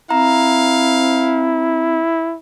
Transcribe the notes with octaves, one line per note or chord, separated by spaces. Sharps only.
C4 E4 F5 A#5